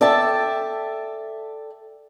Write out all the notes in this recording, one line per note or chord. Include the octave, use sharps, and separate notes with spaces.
A4 D5 E5 G5 A5